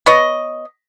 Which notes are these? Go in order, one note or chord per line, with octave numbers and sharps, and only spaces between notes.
B3 C#5 D#5